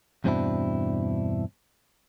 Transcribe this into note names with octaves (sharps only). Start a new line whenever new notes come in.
E2 G2 B2 C4 D4 E4